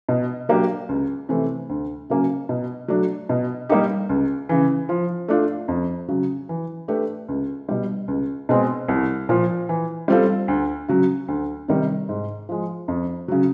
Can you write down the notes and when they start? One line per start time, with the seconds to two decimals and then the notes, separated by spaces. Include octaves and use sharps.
0.09 B2
0.49 F#3 A#3 D4 G4
0.89 C#2
1.29 C3 E3 A3
1.69 D2
2.10 C#3 F#3 A#3 C#4
2.49 B2
2.88 F#3 A3 D4
3.29 B2
3.69 G3 A#3 D#4 G4
4.09 C#2
4.49 C#3 E3
4.89 F3
5.28 A3 D4 F4
5.68 F2
6.08 C#3 F#3
6.49 E3
6.88 A3 D4 G4 B4
7.29 C#2
7.69 B2 G3
8.08 C#2
8.49 B2 G#3 C4
8.88 C2
9.29 A#2 F3
9.69 E3
10.08 G3 C4 F4 A4
10.48 D2
10.88 C#3 F#3
11.28 D2
11.68 C3 D#3 G3
12.09 G#2
12.49 F3 G#3
12.88 F2
13.28 C#3 F#3